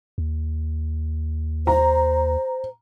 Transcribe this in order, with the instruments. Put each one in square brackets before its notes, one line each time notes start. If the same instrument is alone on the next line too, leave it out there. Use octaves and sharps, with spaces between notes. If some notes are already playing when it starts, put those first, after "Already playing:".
[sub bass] D#2
[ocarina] C5 [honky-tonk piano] A#5